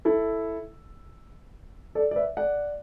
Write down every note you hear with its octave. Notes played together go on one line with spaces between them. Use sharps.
E4 A4
A4 D5
D5
B4 E5
D5 F#5